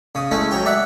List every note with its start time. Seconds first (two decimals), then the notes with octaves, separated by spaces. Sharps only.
0.15 C#3 D#6
0.31 G#3 A3 C#4 E4
0.51 F#3 C#5 G5
0.66 D5 E5 F#5